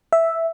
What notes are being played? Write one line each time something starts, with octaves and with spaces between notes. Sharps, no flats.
E5